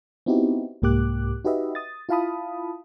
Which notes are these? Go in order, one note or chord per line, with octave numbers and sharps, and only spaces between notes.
B3 C4 D#4 E4 F#4 G4
C2 G#2 A#3 G4 D6 F#6
D#4 F#4 G4 B4 D#5 E5
D#6 A6
E4 F4 F5 A5 B5 D#6